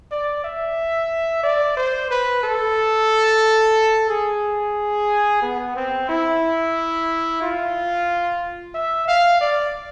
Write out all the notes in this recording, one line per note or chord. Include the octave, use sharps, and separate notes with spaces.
D5
E5
D5
C5
B4
A4
G#4
B3
C4
E4
F4
E5
F5
D5